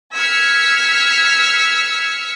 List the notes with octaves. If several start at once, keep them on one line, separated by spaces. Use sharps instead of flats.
E6 F6 G#6 B6 C#7